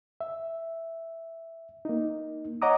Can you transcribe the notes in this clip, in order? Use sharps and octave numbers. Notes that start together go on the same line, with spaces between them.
E5
A#3 D#4
C#5 D#5 F#5 A#5 D6 D#6